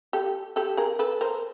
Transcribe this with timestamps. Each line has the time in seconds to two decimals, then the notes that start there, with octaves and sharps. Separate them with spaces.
0.13 G4 A4
0.56 G4 A4
0.77 G#4 A#4
0.99 A4 B4
1.21 A#4 C5